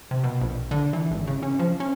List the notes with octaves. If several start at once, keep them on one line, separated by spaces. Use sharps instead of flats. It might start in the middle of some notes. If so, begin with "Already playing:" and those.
C3
B2
A#1
D3
E3
G#1
C#3
C#4
F3
C#4